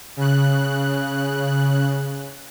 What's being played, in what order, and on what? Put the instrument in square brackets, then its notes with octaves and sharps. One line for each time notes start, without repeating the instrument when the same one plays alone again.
[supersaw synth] C#3 F#6